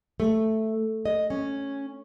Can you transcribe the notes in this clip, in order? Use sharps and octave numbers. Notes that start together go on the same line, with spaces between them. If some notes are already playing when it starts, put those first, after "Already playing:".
A3
D#5
C#4